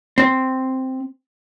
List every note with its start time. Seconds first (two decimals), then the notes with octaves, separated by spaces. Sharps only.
0.18 C4